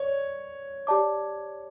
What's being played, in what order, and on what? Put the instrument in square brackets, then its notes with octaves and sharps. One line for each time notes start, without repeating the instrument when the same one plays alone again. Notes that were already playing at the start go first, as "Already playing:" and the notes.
Already playing: [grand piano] C#5 [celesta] D5
[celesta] G4 D5 A5 D6